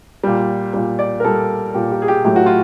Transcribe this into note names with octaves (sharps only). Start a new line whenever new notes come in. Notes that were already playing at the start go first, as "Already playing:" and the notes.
A#2 G3
A#2 G3
D5
A#4
A#2 G3 A4
A#2 G3 G4
G4
G#4
G4
A2 F#3 A3 G4
F#4
F4